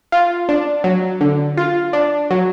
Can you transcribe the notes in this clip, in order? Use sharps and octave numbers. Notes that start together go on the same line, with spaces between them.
F4
D4
F#3
D3
F4
D4
F#3